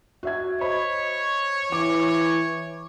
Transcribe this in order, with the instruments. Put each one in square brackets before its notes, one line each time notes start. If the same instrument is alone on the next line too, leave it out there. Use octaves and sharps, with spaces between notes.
[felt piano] F#4 E5 G#6
[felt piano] C5 D#5 B5 [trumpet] C#5
[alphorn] E3 [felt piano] D6